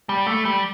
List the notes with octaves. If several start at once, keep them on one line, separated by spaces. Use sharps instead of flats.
G3
A3
G3